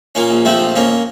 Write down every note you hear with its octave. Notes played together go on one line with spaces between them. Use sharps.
A#2 A#3 C#4
A#1
F3 A3 C4
A#1
F2 A#3 C#4